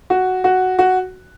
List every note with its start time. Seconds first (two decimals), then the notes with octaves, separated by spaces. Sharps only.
0.10 F#4
0.44 F#4
0.79 F#4